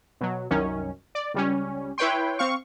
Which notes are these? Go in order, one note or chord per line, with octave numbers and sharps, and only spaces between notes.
B2 F#3
C2 F#2 D#3 C#4
D5
C#2 G3 C#4
E4 B4 C#5 G5 C6
C4 F5 C#6